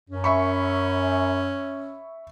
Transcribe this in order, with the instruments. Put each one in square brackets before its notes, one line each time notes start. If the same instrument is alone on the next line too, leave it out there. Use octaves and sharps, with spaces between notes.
[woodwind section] F#2 [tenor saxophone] C#4
[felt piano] E5 B5 C#6